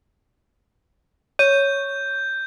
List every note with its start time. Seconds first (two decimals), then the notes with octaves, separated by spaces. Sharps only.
1.39 C#5 G6 D#7